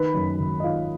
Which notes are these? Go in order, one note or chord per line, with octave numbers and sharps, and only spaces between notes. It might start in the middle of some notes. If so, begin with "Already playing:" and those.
Already playing: D#3 B4 B5
F#2
G#1
D#5
D#3 F4 F5